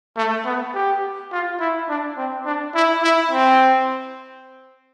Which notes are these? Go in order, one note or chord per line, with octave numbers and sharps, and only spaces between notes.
A3
B3
G4
F4
E4
D4
C4
D4
E4
E4
C4